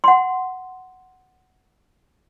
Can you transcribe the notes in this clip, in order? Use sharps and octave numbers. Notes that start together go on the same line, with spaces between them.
F#5 C6